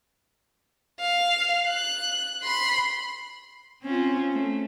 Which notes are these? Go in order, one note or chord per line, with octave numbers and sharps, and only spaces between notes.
F5
F#6
B5 C6
C4 C#4 F4
A3